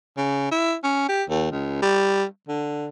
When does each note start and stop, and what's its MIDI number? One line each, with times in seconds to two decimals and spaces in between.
0.17 0.47 49
0.52 0.75 64
0.84 1.04 61
1.09 1.23 67
1.29 1.48 39
1.52 1.80 37
1.82 2.24 55
2.48 2.88 50